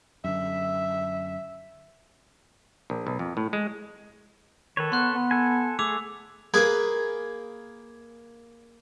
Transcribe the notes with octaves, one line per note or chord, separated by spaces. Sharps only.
F#2 D3 E5
A#1
B1
F2
A2
G#3
D#3 A4 B4 C#5
B3 C6 F#6
B3
A4 G#5
A3 G#4 D6 E6 F7
A#3 G#4 B4 G#5